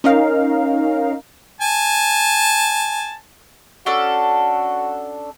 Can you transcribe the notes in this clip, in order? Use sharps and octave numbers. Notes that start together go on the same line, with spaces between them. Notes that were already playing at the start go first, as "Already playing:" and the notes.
C#4 D#4 A#4 F5
G#5 A5
C#4 D4 F#4 A4